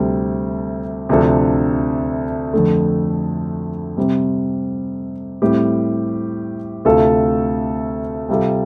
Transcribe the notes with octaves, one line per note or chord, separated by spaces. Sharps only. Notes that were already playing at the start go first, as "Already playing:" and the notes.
Already playing: D2 C3 G3 C4 A4
D2 C3 F3 D4 A4
F2 D3 A3
C3 G3 C4
A2 G3 C4 G4
D2 C3 A3 F4 A4
C3 G3 F4 A4